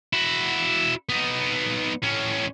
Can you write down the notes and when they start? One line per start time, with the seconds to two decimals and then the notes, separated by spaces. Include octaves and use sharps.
0.13 E4 F#4
1.09 B3 D#4
2.03 A2 C#4